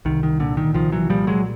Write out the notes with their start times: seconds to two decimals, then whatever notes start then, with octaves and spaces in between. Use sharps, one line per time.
0.05 C2 D#3
0.23 D#3
0.40 A#2 D3
0.57 D#3
0.74 C2 D#3 F3
0.92 E3 F#3
1.09 A#2 F3 G3
1.27 F#3 G#3